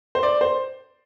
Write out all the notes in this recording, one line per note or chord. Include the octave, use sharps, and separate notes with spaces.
C5
D5
C5